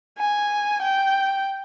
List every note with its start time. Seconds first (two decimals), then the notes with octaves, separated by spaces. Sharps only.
0.18 G#5
0.82 G5